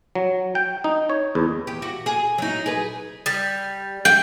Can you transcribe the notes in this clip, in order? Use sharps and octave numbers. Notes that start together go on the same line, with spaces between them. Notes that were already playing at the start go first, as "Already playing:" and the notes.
F#3
G5
D#4
C#5
E2
G4
F#4
G#4
F#3 D#4
G#4 B4
G3
G5